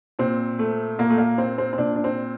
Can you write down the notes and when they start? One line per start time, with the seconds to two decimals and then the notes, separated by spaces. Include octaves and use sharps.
0.19 A#2 C4
0.59 A3
0.98 A#2 A#3
1.10 A3
1.18 A#3
1.38 C4
1.58 C4
1.73 C4
1.78 A#2 D4
1.96 D4
2.04 C4